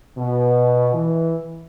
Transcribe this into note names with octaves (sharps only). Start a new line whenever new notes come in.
B2
E3